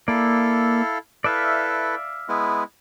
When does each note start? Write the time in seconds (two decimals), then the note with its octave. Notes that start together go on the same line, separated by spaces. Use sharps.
0.08 A#3 E4 A4 D5 F5
1.24 E4 A4 B4 D5 E5 F5
2.28 G#3 B3 E4